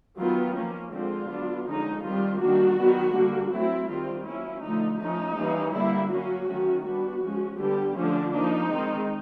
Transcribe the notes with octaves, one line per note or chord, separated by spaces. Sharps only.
D#3 F#3 B3 F4
F3 A#3 C#4
D3 F3 G#3 C4 F4
F#3 B3 D4
D3 F3 G#3 C#4 D#4
D#3 G3 C4 F4
D#3 G3 A#3 D4 F#4
D#3 F#3 B3
D3 G3 A#3 D4
F#3 A3 C4 E4
D#3 G3 C4 F4
F#3 A#3 C#4 E4
D3 F3 A3 D#4
F3 A3 C#4 D#4
E3 G3 A#3 C#4
D3 G3 A#3 E4
F#3 A#3 C#4 F#4
D#3 F#3 A3 C#4
G3 B3 D4 F#4
F3 G#3 C#4
D3 G3 B3 D4 G4
D3 F3 A3 C#4 D4
F3 A#3 D4 D#4
D#3 G#3 C4